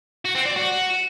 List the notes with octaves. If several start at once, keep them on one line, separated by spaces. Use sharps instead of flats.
F#4
C4
D5
F#4